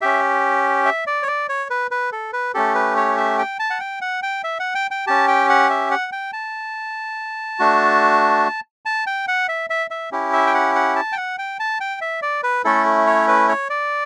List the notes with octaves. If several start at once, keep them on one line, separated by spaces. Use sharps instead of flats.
C#4 G4 E5
E5
D5
C#5
D5
C#5
B4
B4
A4
B4
A3 C#4 G4 A4
B4
C#5
E5
G5
A5
F#5
G5
F#5
G5
E5
F#5
G5
G5
C#4 G4 A5
G5
F#5
E5
F#5
G5
A5
A3 D4 F#4
A5
G5
F#5
E5
E5
E5
C#4 E4 G4
E5
G5
F#5
F#5
A5
G5
F#5
G5
A5
G5
E5
D5
B4
A3 C#4 E4 A4
C#5
B4
C#5
D5